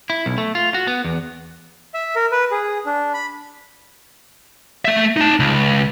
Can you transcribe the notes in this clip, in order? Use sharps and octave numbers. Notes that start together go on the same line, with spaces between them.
E4
B1
A3
F4
F#4
B3
E2
E5
A#4
B4
G#4
D4
B5
A3 E5
D#4 A5
C#2